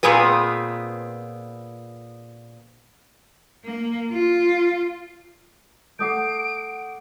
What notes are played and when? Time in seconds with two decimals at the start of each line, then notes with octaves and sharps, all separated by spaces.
0.03 A#2 B3 C4 G#4 B4
3.64 A#3
4.12 F4
5.99 A3 F#5 D6 D#6 G6 C7 D7